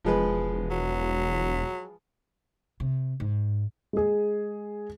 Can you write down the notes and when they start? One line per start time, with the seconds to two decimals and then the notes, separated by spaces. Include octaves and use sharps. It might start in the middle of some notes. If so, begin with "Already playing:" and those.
0.04 E1 F3 G#3 B4
0.70 F#3
2.80 C3
3.20 G#2
3.93 G#3 G#4